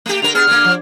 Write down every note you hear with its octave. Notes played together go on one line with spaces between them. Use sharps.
A3 G4
D3 A#4 F7
B3 G#4 F6
D3 A#3
F3